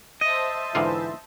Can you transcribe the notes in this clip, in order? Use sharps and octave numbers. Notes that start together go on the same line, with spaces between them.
C5 D#5 E5 A5
G#2 D3 E3 F4